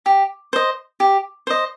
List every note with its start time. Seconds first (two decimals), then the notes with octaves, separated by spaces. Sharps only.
0.06 G4
0.53 C5 D#5
1.00 G4
1.47 C5 D#5